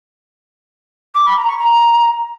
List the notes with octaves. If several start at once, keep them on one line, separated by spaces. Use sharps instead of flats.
D6
B5
A#5
C#6
A#5